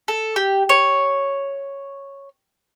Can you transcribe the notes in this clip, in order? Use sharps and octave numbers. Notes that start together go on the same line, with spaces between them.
A4
G4
C#5